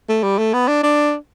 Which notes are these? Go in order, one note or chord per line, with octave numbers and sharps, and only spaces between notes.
A3
G3
A3
B3
D4
D4